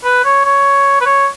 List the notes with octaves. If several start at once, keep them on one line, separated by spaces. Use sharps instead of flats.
B4
C#5
C#5
B4
C#5